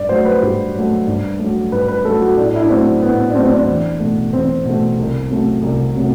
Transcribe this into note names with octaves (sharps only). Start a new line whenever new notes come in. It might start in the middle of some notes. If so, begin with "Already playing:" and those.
Already playing: G2 D5
F#3 A3 C5
B4
G2 G4
F#3 A3
G2
F#3 A3
G2 B4
B4
F#3 A3 A4
F#4
A2 D4
E4
D4
F#3 A3 C4
A2 B3
D4
F#3 A3 C4
C4
D4
E2
B2 A3
E2 C4
B2 A3
C2
C3 F#3 A3
C2
C3 F#3 A3